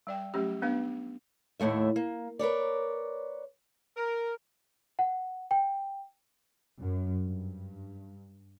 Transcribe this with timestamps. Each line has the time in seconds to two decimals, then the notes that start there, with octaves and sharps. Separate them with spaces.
0.07 G3 D5 G5
0.34 F#3 A3 C#4 G4
0.62 B3 D4 B4 F5
1.60 D#2 A2 A3 E5
1.96 A#3
2.39 A#4 B4 C#5 D5
3.97 A#4
4.99 F#5
5.51 G5
6.80 F#2
7.22 G2